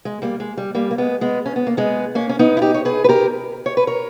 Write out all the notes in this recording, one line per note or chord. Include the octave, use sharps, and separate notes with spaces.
G#3
G3 A#3
G#3
G3
G3 A#3
A#3
G#3 B3
G#3 B3
C#4
B3
A#3
G#3 B3
A#3 C#4
C#4
B3 D#4
E4
D#4 G4
C#5
G#4 B4
B4
G4 A#4
C#5
B4
A#4 C#5